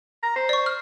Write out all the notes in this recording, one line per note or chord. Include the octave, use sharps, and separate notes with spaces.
A#5
C5
D5 C#6
F6